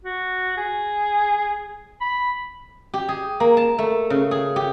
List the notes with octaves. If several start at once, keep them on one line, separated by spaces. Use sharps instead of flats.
F#4
G#4
B5
G4
G#4
A#3
A5
A3
C#3
G#4
G4